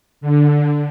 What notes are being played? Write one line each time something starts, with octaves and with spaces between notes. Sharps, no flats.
D3